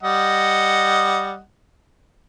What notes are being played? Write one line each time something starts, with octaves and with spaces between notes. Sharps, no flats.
G3 D#5 F#5